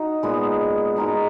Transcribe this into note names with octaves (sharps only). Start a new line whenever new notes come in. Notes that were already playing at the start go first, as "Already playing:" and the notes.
Already playing: D#4 F#4
A#2 G#3 B3
G#3 D#4 F#4 A#4